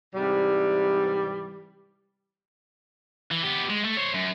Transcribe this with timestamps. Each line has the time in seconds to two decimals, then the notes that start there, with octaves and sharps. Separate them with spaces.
0.15 G#2 C3 E3 G3
3.31 E3
3.43 B3 G4
3.69 G#3
3.84 A3
3.97 C5 C#5
4.14 F#2